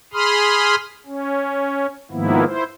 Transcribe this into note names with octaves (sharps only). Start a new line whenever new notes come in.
G#4 B5 C6 D#6 F6
C#4
G#2 D#3 F3 A#3 B3 E4
E4 C5